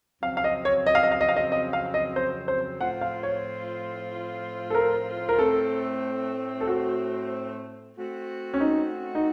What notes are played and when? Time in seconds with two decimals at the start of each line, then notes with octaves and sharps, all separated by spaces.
0.22 F2 C#3 F#3 C4 F5
0.37 F5
0.44 D#5
0.65 C#5
0.87 D#5
0.95 F5
1.03 D#5
1.12 F5
1.21 D#5
1.29 F5
1.37 D#5
1.52 D#5
1.73 F5
1.94 D#5
2.16 C5
2.48 C5
2.80 A2 F3 C4 F4 F#5
3.01 F5
3.23 C#5
4.70 A4
4.75 A#4
5.29 A#4
5.39 A2 A3 C4 A4
6.61 A4
6.67 F#4
7.96 A3 C4 F#4
8.54 C#4
8.60 D#4
9.15 D#4